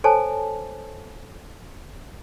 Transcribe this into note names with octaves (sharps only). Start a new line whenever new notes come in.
A4 C5 C#5 G#5 A5